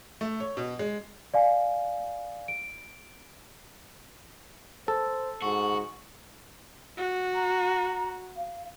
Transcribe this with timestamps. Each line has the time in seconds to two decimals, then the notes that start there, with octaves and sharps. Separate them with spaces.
0.21 A3
0.40 C#5
0.57 B2
0.79 G#3
1.34 D5 F5 G#5
2.48 D7
4.88 A4 C5
5.42 G#2 F#4
6.98 F#4
7.35 A#5
8.37 F5